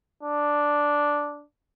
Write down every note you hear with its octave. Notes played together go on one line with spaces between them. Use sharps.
D4